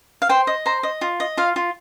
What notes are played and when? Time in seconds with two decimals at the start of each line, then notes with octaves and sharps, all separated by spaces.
0.22 F5
0.29 C5 G5
0.47 D#5
0.66 C5 A#5
0.83 D#5
1.01 F4
1.20 D#5
1.37 F4 F5
1.56 F4